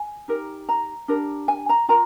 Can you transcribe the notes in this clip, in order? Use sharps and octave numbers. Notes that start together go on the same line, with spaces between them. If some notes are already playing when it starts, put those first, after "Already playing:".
Already playing: G#5
D#4 G4 A#4
A#5
D4 G4 A#4
G#5
A#5
F4 A#4 A#5